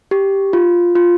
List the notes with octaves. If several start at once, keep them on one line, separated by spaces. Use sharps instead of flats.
G4
F4
F4